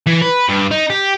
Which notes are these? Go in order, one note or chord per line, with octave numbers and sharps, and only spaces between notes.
E3
B4
G2
D#4
G4